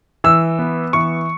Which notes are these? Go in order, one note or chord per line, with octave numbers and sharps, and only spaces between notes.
E3 E6
B3
E3 C#6